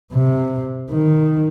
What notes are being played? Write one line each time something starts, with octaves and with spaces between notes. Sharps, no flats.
C3
D#3